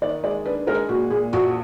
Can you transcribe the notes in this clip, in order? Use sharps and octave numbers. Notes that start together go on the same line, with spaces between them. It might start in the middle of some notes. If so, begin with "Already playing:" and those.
D#3 D5
G#3 D5
D4 B4
G#3 A#4
A#2 F#4
A#2 G#4
A#1 F#4